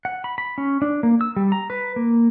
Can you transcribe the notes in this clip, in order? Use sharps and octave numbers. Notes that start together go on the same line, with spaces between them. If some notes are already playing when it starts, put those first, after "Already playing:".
F#5
B5
B5
C#4
D4
A#3
E6
G3
A#5
B4
A#3